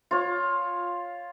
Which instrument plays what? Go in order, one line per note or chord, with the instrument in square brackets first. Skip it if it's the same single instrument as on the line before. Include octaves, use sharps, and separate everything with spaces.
[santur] F4 C#5